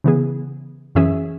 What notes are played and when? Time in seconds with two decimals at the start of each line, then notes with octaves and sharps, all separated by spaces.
0.04 C#3 E3 B3 G#4
0.95 F#2 E3 C#4 G#4 E5